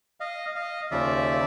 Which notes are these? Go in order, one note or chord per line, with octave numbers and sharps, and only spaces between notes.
D#5 F5
D#5 F5
D#2 C#3 F3 D5 E5